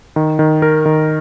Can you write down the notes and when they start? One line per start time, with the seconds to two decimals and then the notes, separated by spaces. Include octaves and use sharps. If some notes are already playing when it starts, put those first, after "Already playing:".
0.16 D#3
0.39 D#3
0.62 A#4
0.86 D#3